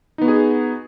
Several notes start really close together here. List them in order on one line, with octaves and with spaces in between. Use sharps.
D#4 B3 F#4 G#4